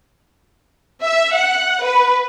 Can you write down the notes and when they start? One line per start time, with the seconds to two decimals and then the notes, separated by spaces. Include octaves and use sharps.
1.03 E5
1.35 F#5
1.83 B4